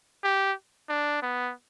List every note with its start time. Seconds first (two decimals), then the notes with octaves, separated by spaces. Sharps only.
0.24 G4
0.89 D4
1.22 B3